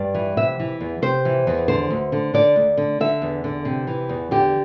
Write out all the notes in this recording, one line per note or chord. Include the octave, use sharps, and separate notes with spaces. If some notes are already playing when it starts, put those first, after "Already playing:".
Already playing: G2 D5
E3
C3 E5
E3
E2
C3 C5
E3
E2
D3 C5
D2
D3
D3 D5
D2
D3
D3 E5
E2
D3
C3
E3
E2
D3 G4